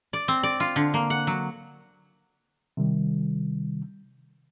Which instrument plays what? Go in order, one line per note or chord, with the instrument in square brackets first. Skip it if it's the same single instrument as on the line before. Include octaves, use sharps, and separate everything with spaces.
[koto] D5
C4
D5
F4
D3
A#3
F#5
F#3
[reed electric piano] C3 D#3 G3